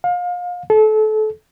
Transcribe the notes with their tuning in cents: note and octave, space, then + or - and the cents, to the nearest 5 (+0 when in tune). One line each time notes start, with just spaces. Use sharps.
F5 +30
A4 -30